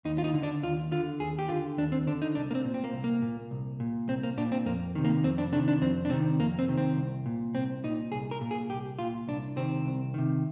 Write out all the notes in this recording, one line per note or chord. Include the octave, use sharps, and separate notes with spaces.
D#2 D#4
F4
D#4
D3
D4
D#2 F4
D3 F4
D#2 G#4
G4
D3 F4
D#2 D4
C4
D3 D4
D#4
C2 D4
A#3
C4
A#2
C4
A#3
C2
A#3
A#2
C2
A#2
C2 C4
A#3
A#2 D4
C4
F2 A#3
C3 D#3
A#3
F2 C4
D4
C3 D#3 D4
D4
F2 C4
D4
C3 D#3 C4
F2 A#3
C4
C3 D#3
C4
C2
A#2
C2 C4
A#2 D#4
C2 G#4
A#4
A#2
G#4
C2 G4
A#2 F4
C2 D4
C3 D#3 C4
C2
C3 D#3